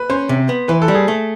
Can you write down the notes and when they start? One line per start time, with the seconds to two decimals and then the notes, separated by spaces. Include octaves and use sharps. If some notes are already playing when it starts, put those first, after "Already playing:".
Already playing: B4
0.10 C#4 C5
0.29 C3
0.49 B3
0.68 E3 B4
0.82 A4
0.88 G3
0.95 G#4
1.08 A3